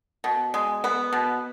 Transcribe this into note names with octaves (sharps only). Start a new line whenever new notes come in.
B2
G#3
B3
B2